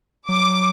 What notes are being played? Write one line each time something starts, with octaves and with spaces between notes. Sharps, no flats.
F#3 D6